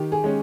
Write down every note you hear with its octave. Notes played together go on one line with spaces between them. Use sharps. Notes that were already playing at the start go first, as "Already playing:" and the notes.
Already playing: D#3 G4
G#4
G#3 C#4